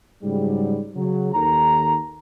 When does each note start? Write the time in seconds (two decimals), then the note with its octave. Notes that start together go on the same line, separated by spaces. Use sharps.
0.23 G#2 C#3 F#3 G3
0.95 C#3 F#3
1.34 D#2 D#3 A4 A#5